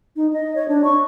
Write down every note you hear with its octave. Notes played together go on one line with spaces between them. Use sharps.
D#4
D#5
C#5
D4
C#6